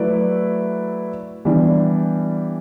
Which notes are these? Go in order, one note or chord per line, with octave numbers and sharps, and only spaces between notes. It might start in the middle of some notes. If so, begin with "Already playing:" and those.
Already playing: F#3 A3 E4 B4 D5
E3 G3 B3 D4